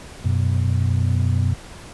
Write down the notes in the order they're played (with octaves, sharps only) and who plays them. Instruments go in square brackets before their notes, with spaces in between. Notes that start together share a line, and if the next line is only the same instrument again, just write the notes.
[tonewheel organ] F#2 B2